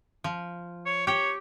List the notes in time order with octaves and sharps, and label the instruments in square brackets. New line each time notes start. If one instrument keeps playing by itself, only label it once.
[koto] F3
[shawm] C#5
[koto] G4 G5 [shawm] C#5